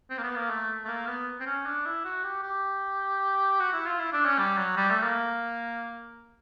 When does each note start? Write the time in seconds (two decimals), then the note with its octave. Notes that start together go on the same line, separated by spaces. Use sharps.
0.10 C4
0.18 A#3
0.23 B3
0.36 A#3
0.50 A3
0.85 A3
0.87 A#3
1.07 B3
1.40 C4
1.46 C#4
1.66 D4
1.86 E4
2.05 F#4
2.24 G4
2.43 G4
3.60 F#4
3.73 E4
3.86 F4
3.99 E4
4.12 D4
4.25 C#4
4.39 G3
4.57 F#3
4.77 G3
4.90 A3
5.03 A#3